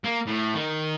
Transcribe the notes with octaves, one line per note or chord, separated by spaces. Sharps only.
A#3
A2
D#3